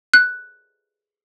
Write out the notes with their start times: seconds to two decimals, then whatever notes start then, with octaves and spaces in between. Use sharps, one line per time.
0.14 F#6